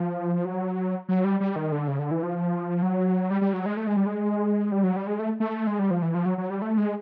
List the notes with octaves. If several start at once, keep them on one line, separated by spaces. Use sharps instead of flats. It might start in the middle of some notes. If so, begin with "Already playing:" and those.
Already playing: F3
F#3
F#3
G3
G3
D#3
D3
C#3
D3
E3
F3
F#3
G3
G3
F#3
G#3
A3
G#3
G3
G#3
G3
F#3
G3
G#3
A3
A3
G#3
G3
F3
E3
F3
F#3
F#3
G3
A3
G#3